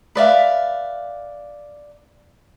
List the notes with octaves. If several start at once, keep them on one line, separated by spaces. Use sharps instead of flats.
B4 D5 E5 F5